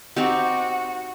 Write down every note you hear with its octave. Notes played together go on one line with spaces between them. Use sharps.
C4 D#4 F#4 G4